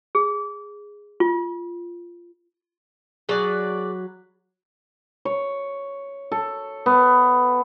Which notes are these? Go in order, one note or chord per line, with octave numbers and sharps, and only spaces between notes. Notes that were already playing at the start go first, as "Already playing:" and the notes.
G#4
F4
F#3 G#4 B4 D5
C#5
A4
B3